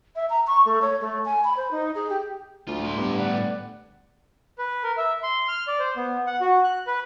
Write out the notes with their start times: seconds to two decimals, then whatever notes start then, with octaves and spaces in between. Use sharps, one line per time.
0.16 E5
0.30 A#5
0.47 C#6
0.65 A3
0.82 C#5
1.01 A3
1.25 G#5
1.44 B5
1.57 C5
1.71 D#4
1.95 G#4
2.10 G4
2.68 D2 F4
2.81 A2 C6
2.97 G2 G3 B3
3.19 D3 D5 F#5
4.58 B4
4.84 A#4
4.97 E5
5.23 C6
5.48 F6
5.68 D5
5.79 C5
5.97 B3
6.27 F#5
6.41 F#4
6.64 F#6
6.87 B4